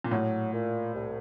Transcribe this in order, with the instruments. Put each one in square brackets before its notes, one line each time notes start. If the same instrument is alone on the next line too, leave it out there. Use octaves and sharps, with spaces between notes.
[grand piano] A#2
[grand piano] A2 [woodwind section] F#3
[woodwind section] A#2
C2